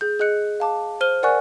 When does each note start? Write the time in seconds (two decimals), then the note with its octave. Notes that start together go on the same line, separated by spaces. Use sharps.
0.01 G#4 G6
0.19 G#4 D#5 F#6 C#7
0.60 F5 A5 D6
1.01 C5 F6 D#7 G7
1.23 A#4 D5 F#5 G#5 C#6 F#6